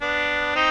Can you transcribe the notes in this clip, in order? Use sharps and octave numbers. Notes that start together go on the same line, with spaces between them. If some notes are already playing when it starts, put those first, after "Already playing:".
B3 D4
C4 D#4